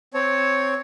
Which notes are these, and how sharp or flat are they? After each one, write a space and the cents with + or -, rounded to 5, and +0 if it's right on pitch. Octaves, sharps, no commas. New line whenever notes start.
C4 +0 C#5 +0 A5 -20